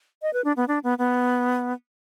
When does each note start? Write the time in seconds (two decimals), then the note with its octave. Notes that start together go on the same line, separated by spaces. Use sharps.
0.22 D#5
0.33 B4
0.44 D4
0.56 B3
0.68 D4
0.83 B3
0.98 B3